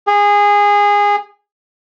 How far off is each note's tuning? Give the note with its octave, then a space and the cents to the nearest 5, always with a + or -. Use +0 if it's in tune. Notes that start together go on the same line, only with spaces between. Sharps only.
G#4 -20